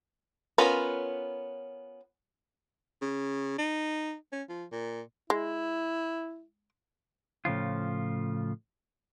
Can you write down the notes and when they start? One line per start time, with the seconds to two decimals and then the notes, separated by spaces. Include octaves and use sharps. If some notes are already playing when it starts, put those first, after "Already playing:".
0.58 B3 C#4 F4 A#4 B4
3.02 C#3
3.58 D#4
4.32 C#4
4.49 F3
4.72 A#2
5.30 G#3 E4
7.45 A2 C#3 F3 F4